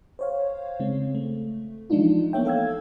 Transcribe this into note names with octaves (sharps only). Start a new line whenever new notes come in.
C5 C#5 F5
C#3 G#3 C4
A3
E3 F3 G#3 D4 D#4 F4
A#3 B3 C#5 E5 G5
A4 F5 E6 G#6